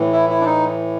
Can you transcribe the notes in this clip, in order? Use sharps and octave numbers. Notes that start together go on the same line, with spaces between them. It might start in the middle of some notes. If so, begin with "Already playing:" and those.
Already playing: A2 E3
E4
E4
D4
D#4